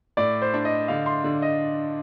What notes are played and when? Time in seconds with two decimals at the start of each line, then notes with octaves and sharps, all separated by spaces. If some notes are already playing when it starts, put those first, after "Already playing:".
0.17 A2 D5
0.42 C5
0.54 D4
0.65 D#5
0.88 D3 F5
1.06 C6
1.24 D3
1.42 D#5